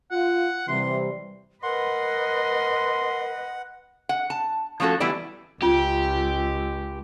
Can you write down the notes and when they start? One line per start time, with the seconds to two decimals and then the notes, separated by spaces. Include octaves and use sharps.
0.11 F4 F#5
0.68 C3 E3 G3 C6
1.63 A#4 B4 D#5 F#5 C6
4.09 F#5
4.30 A5
4.80 F3 A3 C#4 F#4 A4
5.00 E3 G3 B3 E4 D5
5.62 C#2 C#4 F4 G4